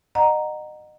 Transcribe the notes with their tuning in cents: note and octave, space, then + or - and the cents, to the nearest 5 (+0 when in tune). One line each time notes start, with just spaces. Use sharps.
D#5 -30 F#5 +0 A#5 +0